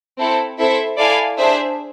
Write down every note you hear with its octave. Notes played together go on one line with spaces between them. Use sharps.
C4 E4 A4
C4 E4 A4 C5 E5
E4 A4 D5 F5 G#5
D4 G#4 C5 E5